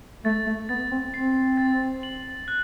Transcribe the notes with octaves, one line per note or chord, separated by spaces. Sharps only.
A3 A6
A3
B3 A6
C4
C4 C7
A6
F#7
F#6